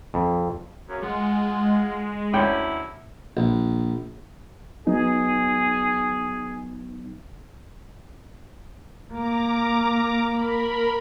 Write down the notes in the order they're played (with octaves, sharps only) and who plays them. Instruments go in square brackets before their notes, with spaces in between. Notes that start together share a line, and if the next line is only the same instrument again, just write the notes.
[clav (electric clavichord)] F2
[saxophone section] F#2 C#3
[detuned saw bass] G#3 [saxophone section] F4 F#5
[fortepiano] D2 C#4 G5 [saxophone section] F#3 E4
[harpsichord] A#1
[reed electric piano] F#3 B3 D#4 [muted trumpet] G#4
[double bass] A#3 [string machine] A#5 D6
[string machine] A#4 B5